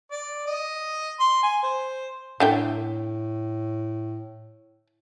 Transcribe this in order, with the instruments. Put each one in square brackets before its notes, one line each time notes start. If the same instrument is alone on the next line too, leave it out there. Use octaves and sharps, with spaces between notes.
[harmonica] D5
D#5
C6
G#5
C5
[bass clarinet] A2 [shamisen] D3 A3 G5